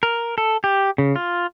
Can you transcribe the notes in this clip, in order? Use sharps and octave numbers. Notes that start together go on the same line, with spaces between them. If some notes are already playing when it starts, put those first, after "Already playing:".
A#4
A4
G4
C#3
F4